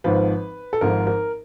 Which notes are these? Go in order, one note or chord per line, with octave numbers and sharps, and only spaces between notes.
G#1 G#2 F3 B4
A4
G#1 G#2 F3 A#4
A#4